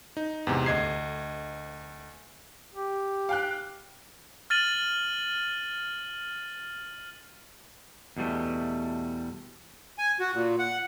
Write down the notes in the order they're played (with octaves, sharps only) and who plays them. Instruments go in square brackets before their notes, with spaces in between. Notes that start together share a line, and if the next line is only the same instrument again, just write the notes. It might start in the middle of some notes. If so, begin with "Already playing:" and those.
[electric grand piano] D#4
E2 G#2 C3
D2 D#5 G#6 C7
[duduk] G4
[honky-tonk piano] F5 G5 F#6
[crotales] F6 A6 D#7 F#7
[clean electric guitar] E2 B2 G3 A3
[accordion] G#5
F#4
A#2
F#5